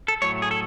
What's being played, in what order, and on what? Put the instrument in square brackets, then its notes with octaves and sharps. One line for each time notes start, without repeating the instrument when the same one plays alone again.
[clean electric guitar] A4
A2 F#3 A3 C#5
G#4
A4